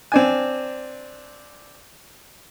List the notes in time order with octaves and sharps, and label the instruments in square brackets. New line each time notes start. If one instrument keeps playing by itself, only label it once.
[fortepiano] C4 D4 G#5